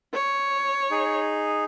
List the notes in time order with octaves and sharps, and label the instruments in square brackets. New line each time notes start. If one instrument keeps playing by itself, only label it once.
[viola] C#5
[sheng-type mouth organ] D#4 G#4